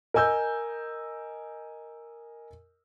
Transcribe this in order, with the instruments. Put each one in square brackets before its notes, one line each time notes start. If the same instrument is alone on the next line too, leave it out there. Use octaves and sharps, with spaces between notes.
[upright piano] A#4 D#5 G#5 E6 G6